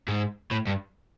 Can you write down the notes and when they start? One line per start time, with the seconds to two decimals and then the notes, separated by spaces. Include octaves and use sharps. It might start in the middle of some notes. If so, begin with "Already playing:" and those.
0.08 G#2
0.51 A2
0.67 G2